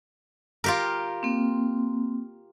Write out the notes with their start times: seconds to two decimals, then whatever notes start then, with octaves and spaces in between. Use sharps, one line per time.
0.64 F4 G4 A#4
1.23 A#3 C4